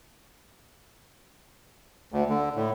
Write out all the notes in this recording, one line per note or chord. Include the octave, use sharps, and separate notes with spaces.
D2
D3
A2